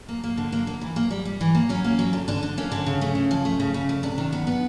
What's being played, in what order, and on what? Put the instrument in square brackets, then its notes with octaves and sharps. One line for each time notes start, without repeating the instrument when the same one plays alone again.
[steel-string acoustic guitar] A#3
A#3
D3
A#3
A#3
E3
A#3
G3
G3
E3
A#3
F#3 C#4
A#3
F#3
D3
D3 D4
D3
A#3 C#4
D3
C#3
A3
C#3
F3
A3
C#3
C#3
A3
C3 D4
D#3
B3
B3